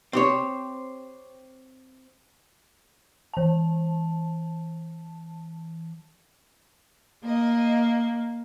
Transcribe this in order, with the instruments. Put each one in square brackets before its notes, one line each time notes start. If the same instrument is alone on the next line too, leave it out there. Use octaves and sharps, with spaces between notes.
[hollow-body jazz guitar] C4 G4 C#5
[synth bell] E3 A5
[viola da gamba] A#3 [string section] D#5